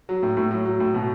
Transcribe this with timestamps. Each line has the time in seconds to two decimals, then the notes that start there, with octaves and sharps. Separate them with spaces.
0.09 F#3
0.23 A2
0.37 A2
0.51 F#3
0.65 F#3
0.80 A2
0.94 B2